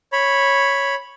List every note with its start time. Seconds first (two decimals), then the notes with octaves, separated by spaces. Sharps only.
0.12 C#5 B5